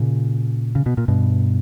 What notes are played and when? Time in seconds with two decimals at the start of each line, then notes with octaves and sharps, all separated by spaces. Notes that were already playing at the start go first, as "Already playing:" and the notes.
Already playing: A#2 C#3
0.75 C#3
0.86 B2
0.97 A#2
1.08 G2 B2